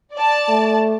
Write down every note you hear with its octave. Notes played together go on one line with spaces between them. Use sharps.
D5 A5
A3